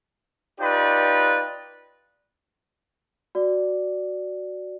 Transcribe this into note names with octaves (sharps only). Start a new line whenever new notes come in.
D#4 F4 G4 B4 D5
F#4 D5